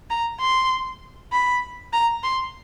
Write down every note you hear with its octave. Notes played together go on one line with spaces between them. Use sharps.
A#5
C6
B5
A#5
C6